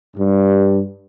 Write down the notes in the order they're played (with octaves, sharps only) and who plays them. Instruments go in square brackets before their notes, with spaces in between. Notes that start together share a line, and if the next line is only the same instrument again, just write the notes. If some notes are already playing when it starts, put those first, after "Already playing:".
[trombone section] G2